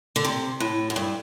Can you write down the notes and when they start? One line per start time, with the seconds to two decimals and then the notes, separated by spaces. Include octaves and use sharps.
0.16 D3
0.25 C3
0.60 A2
0.90 F#2
0.96 G2